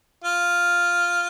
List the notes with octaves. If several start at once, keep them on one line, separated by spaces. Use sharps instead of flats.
F4